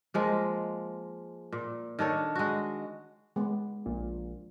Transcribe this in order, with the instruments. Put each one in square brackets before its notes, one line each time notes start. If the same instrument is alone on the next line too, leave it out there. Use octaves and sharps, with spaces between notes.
[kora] F3 G#3 A#3
A#2
D#3 D4 A4 C#5
G#3 F#4
[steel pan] G#3 B3
[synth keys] A#1 A#2